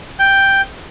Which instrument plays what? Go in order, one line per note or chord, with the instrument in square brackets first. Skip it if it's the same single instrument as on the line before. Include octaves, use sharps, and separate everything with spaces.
[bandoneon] G5 G6